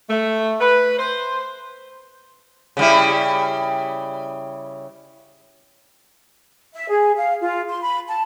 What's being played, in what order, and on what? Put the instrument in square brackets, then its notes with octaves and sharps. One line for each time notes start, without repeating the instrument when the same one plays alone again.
[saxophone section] A3
B4
C5
[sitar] C#3 G3 E4
[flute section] E5
G#4
F5
F4
C6
B5
A5